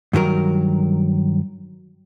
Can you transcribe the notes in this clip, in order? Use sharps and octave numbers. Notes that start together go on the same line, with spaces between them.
G2 D#3 F#3 A#4